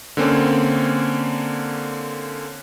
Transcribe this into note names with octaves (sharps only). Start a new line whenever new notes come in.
D3 A#3 C4 C#4